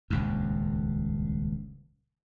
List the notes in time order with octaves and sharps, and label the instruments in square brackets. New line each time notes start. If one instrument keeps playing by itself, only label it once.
[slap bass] D#1 C#2 G2